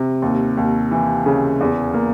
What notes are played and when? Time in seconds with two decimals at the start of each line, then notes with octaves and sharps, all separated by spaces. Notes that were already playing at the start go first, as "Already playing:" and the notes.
Already playing: C3
0.22 D#2
0.57 D#2
0.91 E3
1.26 C#3
1.61 E2
1.94 A#3